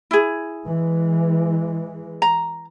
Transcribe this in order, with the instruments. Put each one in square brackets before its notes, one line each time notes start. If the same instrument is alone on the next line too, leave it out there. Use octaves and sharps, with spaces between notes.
[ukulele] E4 G#4
[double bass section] E3 G#3
[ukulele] A#5